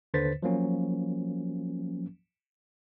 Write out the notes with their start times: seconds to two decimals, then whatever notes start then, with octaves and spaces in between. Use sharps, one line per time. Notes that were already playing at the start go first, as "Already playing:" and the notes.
0.14 D#2 D3 B4 C5 A6 B6
0.43 F3 F#3 A#3 C#4